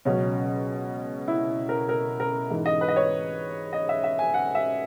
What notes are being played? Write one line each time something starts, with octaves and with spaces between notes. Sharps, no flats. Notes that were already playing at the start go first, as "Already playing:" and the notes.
C#2 B2 F#3 C#4
E4
A#4
A#4
A#4
G#2 E3
D#5
B4
D#5
C#5
D#5
E5
E5
G#5
F#5
E5